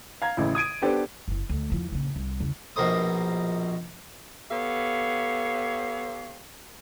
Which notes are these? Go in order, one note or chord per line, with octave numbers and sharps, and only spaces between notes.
F5 A#5 G#6
A1 C#3 E4
D#6 G#6 D7 D#7
B3 D4 G4 A4 C5
F#1 E4
D2
E2 F3
A#1 C#3
C2
E2 C#3
A#1 B2 A#4 C5 D#6
B3 G4 A4 C#5 F5